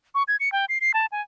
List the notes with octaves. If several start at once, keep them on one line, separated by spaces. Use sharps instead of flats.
C#6
G#6
C#7
G5
C7
C7
A5
G#5